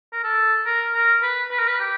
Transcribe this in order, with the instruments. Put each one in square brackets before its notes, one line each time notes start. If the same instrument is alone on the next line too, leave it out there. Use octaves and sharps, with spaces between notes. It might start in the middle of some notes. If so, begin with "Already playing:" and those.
[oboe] A#4
A4
A#4
A#4
B4
B4
A#4
B4
G4